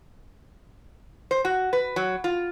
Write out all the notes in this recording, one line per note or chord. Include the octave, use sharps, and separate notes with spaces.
C5
F#4
B4
F#3
F4